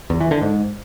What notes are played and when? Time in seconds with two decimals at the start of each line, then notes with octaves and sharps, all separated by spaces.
0.10 E2
0.21 E3
0.31 D3
0.42 G#2